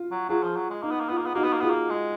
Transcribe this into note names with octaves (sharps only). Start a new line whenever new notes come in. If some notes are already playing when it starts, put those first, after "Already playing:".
Already playing: F4
F#3
F#3 F4 G#4
F3
F#3
G#3
A#3 D#4
B3
A#3
B3 F4
A#3
B3
A#3 D#4 F#4
B3
A#3
B3 F4 G#4
A#3
G#3